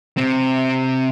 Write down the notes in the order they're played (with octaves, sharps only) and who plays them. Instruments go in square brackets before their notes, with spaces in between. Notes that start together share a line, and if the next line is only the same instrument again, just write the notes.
[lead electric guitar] C3 C4